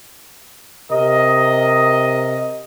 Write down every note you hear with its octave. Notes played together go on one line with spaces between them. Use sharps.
C3 A#4 D#5